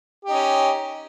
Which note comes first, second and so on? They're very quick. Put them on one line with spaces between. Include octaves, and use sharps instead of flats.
G4 D#4 C#4